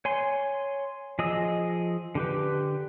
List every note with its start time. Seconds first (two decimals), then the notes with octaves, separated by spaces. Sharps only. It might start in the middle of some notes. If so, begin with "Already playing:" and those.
0.05 C#5 G#5 C6
1.19 F3 G#4 D#5 D#6 E6
2.15 D3 G4 B4